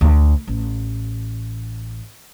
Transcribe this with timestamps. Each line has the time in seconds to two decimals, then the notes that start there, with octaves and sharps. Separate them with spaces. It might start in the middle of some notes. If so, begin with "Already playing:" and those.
0.01 D2
0.47 A1